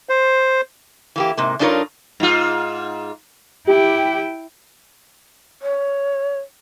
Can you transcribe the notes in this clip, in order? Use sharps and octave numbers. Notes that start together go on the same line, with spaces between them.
C5
E3 A#3 G4
G#2 C3 A#3
G2 D4 D#4 F4 A#4 C#5
G#2 F4
E4 G4 G5
C#5